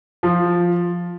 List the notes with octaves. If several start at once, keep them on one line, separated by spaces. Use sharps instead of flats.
F3